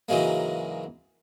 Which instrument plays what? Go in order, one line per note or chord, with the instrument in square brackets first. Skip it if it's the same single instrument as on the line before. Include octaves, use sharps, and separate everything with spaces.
[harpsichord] G#2 C#3 E3 F#3 G#3 A#3